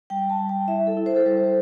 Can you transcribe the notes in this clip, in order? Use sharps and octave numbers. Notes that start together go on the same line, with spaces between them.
G3 G5
A5
G3
G5
E4 E5
A4
E4
C5
A4
G3 C5